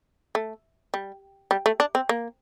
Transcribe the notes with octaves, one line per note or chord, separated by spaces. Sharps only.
A3
G3
G3
A3
D4
C4
A#3